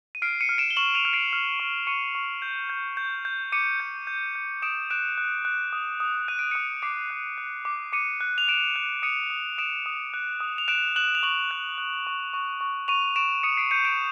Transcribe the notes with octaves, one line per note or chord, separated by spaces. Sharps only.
D#7
F6 C7 D7
C#7 D#7
F6
D7 E7
G7
C#6 E7 F#7
D#7 F7
F6
C7 D7
F6
C#6
C#6 C#7 D#7
C#6
G6
G6
G6
G6
D6 C#7 D#7
G6
G6
G6
D#6 D7 E7
F#6 D7 E7
F#6
F#6
D#6
D#6
F#6 D#7
D7
D#6 C#7 D#7
D6 C7 D7
F#6
F#6
D6
D6 C#7 D#7
F#6
F7
F#6 D7 E7
F#6
D#6 C#7 D#7
D#6
D#6 D7 E7
D#6
F#6
D#6
F7
F#6 D7 E7
F#6 E7 F#7
F7
C#6 E7 F#7
F#6
F#6
C#6
C#6
C#6
C#6 D#7 F7
C#6 D7 E7
D#6 C#7 D#7
C7 D7
G6 C#7 D#7
D7 E7